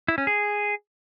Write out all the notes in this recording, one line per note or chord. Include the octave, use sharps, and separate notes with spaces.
E4
C#4
G#4